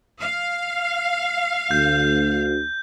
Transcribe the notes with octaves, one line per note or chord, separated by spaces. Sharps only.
F5
D2 G6